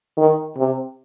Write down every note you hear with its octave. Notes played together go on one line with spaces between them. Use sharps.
D#3
C3